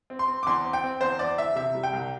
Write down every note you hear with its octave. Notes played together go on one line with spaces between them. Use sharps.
C4
C6
C4
D6
E2 C6
C4
G5
C4
E2 C5
E2 D5
E2 E5
C3 E5
G3
G5
C2